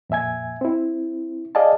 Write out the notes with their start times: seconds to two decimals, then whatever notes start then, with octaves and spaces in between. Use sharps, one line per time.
0.10 F2 A#2 E5 G#5 G#6
0.61 C4 E4
1.55 G#4 D5 D#5 F5 G#5 A5